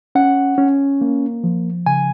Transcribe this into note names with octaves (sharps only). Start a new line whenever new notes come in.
C#4 F#5
C#4
A#3
F3
C#3 G#5